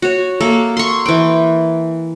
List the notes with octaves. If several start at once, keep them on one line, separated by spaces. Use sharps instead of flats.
F#4 C#5
A#3 A4
C6 C#6
E3 G5